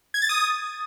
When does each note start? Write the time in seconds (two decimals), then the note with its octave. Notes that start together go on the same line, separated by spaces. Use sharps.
0.14 G#6
0.22 A6
0.29 D#6